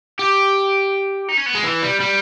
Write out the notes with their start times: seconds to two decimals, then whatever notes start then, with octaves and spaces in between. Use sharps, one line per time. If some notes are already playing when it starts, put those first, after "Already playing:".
0.19 G4
1.28 D#4
1.37 C#4
1.46 B3
1.55 G#3
1.64 E3
1.82 G3
2.00 G3